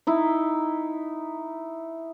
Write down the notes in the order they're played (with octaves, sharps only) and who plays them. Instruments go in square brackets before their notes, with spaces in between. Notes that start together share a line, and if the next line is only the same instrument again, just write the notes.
[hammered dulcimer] D#4 E4